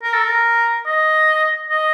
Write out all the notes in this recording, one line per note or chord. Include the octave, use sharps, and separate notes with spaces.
A#4
A4
A#4
D#5
D#5